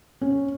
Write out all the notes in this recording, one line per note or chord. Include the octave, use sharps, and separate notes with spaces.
C#4